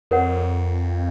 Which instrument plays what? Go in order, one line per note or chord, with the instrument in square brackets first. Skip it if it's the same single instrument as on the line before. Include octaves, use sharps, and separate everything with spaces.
[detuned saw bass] F2 [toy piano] A#4 C#5 F#5